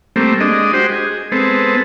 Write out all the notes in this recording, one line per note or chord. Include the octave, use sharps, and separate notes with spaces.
G3 A3 A#3 C4
G#3 D4 D#5
F#4 G4 C5
G#4
G#3 B3 C4 A4